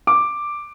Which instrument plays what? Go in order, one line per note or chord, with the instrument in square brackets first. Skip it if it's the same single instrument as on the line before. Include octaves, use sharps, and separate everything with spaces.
[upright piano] D6